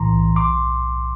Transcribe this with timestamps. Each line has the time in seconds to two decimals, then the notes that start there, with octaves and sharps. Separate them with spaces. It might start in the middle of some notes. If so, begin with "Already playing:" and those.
Already playing: B1 A2 E3 A#5 C6
0.13 B1
0.36 C6 D6